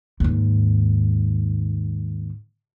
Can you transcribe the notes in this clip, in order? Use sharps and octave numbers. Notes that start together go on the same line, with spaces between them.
D#2 G#2